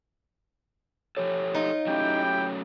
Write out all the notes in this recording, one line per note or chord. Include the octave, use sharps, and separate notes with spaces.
F3 G4 A4 C#5
D#4 F4
F#3 A3 C#4 E4 G4 G5